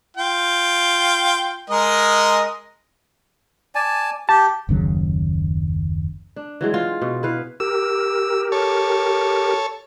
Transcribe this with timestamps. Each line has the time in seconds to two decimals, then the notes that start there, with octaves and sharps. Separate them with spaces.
0.17 F4 G5
1.70 G#3 A#4 D#5
3.75 D5 G#5 A5
4.29 G4 A5
4.69 F#1 D#2 C#3 F#3
6.36 D4
6.61 E3 F#3 G#3
6.74 F4
7.02 B2
7.23 E4 B4 F5
7.60 G4 A#4 E6
8.52 A4 C#5